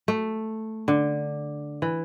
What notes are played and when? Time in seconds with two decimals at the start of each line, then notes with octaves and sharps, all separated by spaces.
0.08 A3
0.88 D3
1.82 E3